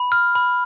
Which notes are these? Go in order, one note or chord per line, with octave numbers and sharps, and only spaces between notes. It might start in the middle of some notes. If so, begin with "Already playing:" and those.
Already playing: B5
F6
B5